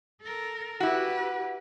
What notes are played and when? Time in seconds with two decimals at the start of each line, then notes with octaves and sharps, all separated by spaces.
0.21 A4 A#4
0.80 E4 F#4 G4 B4